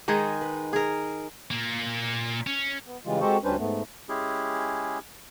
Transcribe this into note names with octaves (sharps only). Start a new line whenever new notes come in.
D#3 G#3 D#4 G#4
B4
G#4 A#4
A#2 A#3
C#4
B3
C#3 E3 G3 G#3 F4
G#3 C4 F#4 G4 A4 C5
D2 G3 C#4 D4 B4 C5
G#2 A3 B3
G#3 C#4 E4 G4 G#4